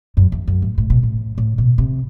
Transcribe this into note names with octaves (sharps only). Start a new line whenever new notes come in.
F#2
E2
F#2
A2
A2
B2
A2
A2
B2
C3